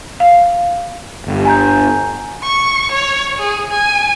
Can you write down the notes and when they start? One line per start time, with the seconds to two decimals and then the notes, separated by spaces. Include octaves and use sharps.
0.20 F5
1.26 G1
1.45 G#5 A#5 G6
2.43 C#6
2.92 C#5
3.39 G#4
3.71 G#5